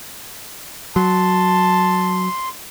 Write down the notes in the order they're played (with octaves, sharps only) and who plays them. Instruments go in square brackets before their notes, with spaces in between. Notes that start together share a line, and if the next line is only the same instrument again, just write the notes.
[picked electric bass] F#3 [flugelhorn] A5 [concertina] C6